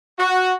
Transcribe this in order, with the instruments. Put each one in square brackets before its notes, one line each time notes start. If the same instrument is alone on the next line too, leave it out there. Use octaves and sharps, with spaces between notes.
[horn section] F#4